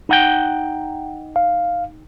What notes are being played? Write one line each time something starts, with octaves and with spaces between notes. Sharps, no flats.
D#4 F#5 G5
F5